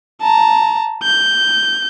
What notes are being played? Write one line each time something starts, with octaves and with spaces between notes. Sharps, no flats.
A5 A#5
G6